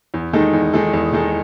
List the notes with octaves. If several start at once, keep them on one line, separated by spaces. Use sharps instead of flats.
E2
D#3 G#3 D#4 A4
E2
D#3 G#3 D#4 A4
E2
D#3 G#3 D#4 A4